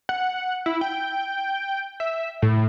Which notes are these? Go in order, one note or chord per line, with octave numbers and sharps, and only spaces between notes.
F#5
E4
G5
E5
A2